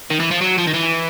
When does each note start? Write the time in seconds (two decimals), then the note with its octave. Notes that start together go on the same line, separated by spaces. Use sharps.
0.10 D#3
0.20 E3
0.31 F3
0.41 F#3
0.58 F3
0.67 D#3
0.74 E3